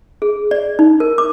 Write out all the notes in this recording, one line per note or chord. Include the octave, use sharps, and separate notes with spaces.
G#4
D5
D#4
A#4
D6